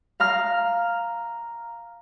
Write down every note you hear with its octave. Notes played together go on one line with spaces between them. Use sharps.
F5 A#5 F6